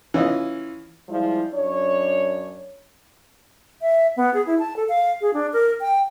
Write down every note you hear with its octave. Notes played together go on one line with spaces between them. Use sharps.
E3 C#4 F4 D#5
F3 G3 G#3 E4 F4
F#2 D4 C#5
E5
B3
G#4
E4
A5
A4
F5
G#4
D4
A#4
G5